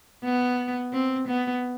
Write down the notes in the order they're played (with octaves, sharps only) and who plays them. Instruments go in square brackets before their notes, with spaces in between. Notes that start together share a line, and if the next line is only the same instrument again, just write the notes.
[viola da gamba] B3
C4
B3